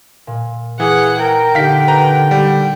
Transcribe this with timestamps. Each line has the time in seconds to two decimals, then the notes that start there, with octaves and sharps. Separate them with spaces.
0.27 A#2
0.80 E3 G#4 F#5
1.19 A#4 F#5 G5
1.55 D3 D#4 G4 A#4 F5 B6
1.88 B4 A#5
2.31 G3